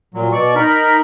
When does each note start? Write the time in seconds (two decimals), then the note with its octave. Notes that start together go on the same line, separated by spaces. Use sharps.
0.14 A#2 F#3
0.32 B2 D5 C#6
0.56 D#4 A#4 B5